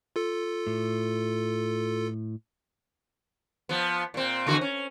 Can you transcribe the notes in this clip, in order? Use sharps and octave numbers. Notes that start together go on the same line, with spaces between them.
F4 A4
A2
F3 B3
A#2 C4
E2 D3 F#4
C#4